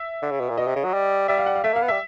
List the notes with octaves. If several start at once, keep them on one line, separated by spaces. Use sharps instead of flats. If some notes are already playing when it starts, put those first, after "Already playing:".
Already playing: E5
D3
C#3
B2
A#2
B2 D#5
C3
C#3
F#3
G3
G3 E5
F5
F#5
F5
A3 E5
A#3
F5
B3
G3 E5